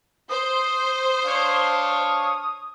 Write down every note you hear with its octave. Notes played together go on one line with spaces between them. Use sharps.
C5 D#6
D4 C#5 F5